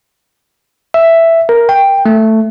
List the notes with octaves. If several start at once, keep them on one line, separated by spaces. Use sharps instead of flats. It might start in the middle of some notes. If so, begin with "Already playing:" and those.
E5
A#4
G5
A3